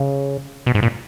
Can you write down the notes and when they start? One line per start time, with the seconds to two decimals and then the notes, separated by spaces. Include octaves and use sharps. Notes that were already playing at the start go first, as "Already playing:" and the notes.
Already playing: C#3
0.66 B2
0.75 G#2
0.82 A#2